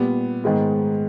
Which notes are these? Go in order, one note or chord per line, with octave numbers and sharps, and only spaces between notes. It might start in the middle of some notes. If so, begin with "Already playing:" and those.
Already playing: A#2 G3 B3
G#2 D#3 G#3 B3